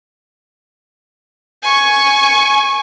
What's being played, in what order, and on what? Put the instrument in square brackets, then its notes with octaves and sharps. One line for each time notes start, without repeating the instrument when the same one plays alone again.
[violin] G#5 C#6